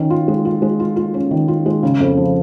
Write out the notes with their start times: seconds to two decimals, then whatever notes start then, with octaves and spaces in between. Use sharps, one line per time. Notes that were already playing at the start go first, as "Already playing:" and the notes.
Already playing: D#3 C#4
0.10 F4
0.28 G#3
0.45 F4
0.62 G#3
0.79 F4
0.96 F4
1.14 C#4
1.31 D#3
1.48 F4
1.66 G#3
1.83 C#3
2.00 F2
2.17 F3